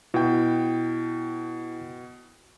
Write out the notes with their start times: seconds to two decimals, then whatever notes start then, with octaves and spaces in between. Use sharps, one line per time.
0.14 B2 E4 G5